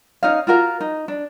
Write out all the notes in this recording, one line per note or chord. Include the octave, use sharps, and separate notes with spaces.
C#4 D#4 D#5 F5
F4 F#4 A#4 F5
D#4
D4